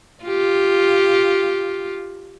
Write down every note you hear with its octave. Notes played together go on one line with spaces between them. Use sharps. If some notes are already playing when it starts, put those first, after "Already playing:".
F4 G4